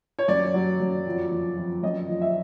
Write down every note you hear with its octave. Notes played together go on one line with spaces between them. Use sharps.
C#5
F#2 D5
F#3
F#2
F2
F3
F2
F#2 D#5
F3
E5